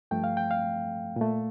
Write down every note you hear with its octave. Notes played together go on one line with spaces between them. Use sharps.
G2 F3 A3 G5
F5
G5
F5
A#2 A3